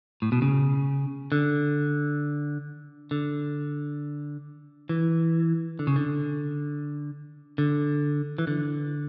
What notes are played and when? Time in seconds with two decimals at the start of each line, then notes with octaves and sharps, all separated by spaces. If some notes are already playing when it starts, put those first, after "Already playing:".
0.22 A2
0.32 B2
0.42 C#3
1.32 D3
3.11 D3
4.89 E3
5.79 D3
5.87 C#3
5.96 D3
7.58 D3
8.38 E3
8.47 D3